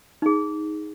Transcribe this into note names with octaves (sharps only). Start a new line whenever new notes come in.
D#4 G#4